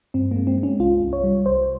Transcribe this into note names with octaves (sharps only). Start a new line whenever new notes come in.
G2 C4
G#3 A#3
C4
G#3
C#4
C2 F4
C2
C#5
G3
C2 C5